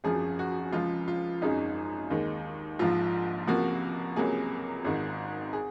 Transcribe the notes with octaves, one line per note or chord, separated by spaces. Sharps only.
G#1 F#2 F3 G#4
F#4
C#2 C#3 F3 G#3 F4
F4
G#1 F#2 C#3 G#3 D#4
D#2 D#3 G#3
A#1 G#2 F3 F4
C#2 C3 F3 A#3 F#4
C#2 C3 F#3 A#3 G#4
G#1 G#2 D#3
G#4